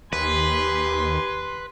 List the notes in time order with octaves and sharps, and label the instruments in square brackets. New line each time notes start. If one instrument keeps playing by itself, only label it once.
[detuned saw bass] D#2 [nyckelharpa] G4 G#5 [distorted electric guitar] B4 [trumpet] C6